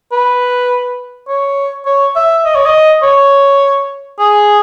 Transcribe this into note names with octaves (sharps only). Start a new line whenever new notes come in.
B4
C#5
C#5
E5
D#5
C#5
D#5
C#5
G#4